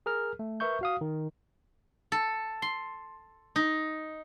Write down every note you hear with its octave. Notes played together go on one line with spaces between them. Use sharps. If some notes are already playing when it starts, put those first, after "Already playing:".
G#4 A#4 F6
A3
A#4 B4 E5 C#6 G6
F#4 F5 D#6
D#3
A4
C6
D#4